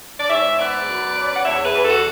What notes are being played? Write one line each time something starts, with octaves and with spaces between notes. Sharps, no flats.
D5
G#2 C#5 E5
B3 B4 D5
F#2
C#4
F#5
E2 C#5 E5
G#4 B4
E2
F#4 A4